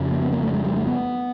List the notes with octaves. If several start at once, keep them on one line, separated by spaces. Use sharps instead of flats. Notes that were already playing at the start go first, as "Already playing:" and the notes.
Already playing: F2 C#3
A#3
B3
A#3
A3
G#3
G3
A3
B3